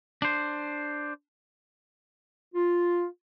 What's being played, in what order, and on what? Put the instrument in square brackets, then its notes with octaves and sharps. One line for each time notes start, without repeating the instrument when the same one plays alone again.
[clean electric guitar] D4 C5
[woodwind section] F4